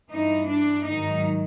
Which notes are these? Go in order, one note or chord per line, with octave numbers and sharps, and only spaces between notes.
G2 E3 D#4
D4
G#2 D#3 F#3 D#4